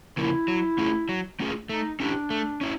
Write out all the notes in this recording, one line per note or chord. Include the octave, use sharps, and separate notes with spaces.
C#3 F3 A#3 E4
F#3
A3 C#4 F4 G#4
F#3
A3 C#4 F4 G#4
A3 D#4
C#4 D4 E4 G4
A3
C#4 E4